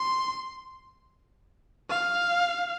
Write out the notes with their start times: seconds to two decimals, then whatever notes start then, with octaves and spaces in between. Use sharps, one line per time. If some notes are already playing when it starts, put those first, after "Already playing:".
Already playing: C6
1.90 F5